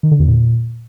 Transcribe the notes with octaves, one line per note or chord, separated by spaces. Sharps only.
D#3
D3
E2
A#2